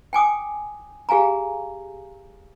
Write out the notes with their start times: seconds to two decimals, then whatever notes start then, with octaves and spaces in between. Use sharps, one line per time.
0.13 G5 G#5 D6 D#6
1.09 G4 G#4 F5 G#5 A#5